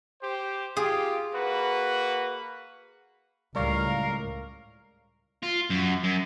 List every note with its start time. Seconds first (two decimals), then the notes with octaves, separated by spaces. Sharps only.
0.22 G4 C5
0.77 F4 G4 G#4
1.34 A#3 F#4 B4
3.56 C#2 A2 G3 A#4 D5 F5 C#6
5.43 F4
5.70 F#2
6.03 F#2